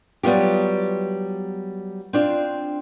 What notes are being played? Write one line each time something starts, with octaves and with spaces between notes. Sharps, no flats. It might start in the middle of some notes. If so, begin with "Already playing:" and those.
F#3 G3 B3 F4 G4
C4 D4 F4